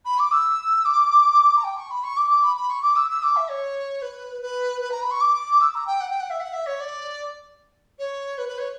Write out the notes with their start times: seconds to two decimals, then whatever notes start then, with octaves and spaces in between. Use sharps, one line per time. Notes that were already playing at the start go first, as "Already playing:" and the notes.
0.05 B5
0.18 D6
0.31 E6
0.85 D6
1.56 A#5
1.64 G5
1.76 C#6
1.90 B5
2.03 C#6
2.16 D6
2.30 D6
2.43 B5
2.56 B5
2.69 C#6
2.82 D6
2.96 E6
3.09 E6
3.22 D6
3.36 E5
3.48 C#5
4.01 B4
4.41 B4
4.81 B4
4.91 A#5
5.01 B5
5.11 C#6
5.20 D6
5.60 E6
5.74 A#5
5.86 G5
6.00 F#5
6.10 G5
6.20 F#5
6.30 E5
6.40 F#5
6.52 E5
6.66 C#5
6.80 D5
7.98 C#5
8.38 B4
8.48 B4
8.58 C#5